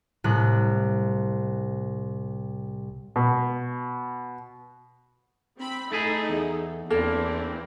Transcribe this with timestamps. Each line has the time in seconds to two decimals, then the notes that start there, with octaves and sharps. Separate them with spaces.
0.24 C2 A2 F#6
3.16 B2
5.58 C4 B5
5.92 A3 D#4 E4 G#4 A4
6.29 E2 G#4
6.91 E2 E3 A#3 C4 D4 A4